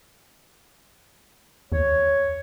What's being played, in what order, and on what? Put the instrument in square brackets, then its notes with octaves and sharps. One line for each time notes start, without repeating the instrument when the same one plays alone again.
[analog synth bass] E2 [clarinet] C#5